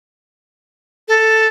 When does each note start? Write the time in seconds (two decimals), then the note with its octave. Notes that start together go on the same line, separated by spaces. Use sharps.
1.08 A4